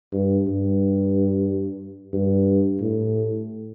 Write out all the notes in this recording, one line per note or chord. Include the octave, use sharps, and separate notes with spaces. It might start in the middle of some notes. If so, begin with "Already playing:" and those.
G2
G2
G2
A2